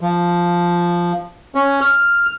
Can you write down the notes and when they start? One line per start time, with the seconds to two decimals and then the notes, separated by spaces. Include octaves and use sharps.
0.01 F3
1.55 C#4
1.81 F6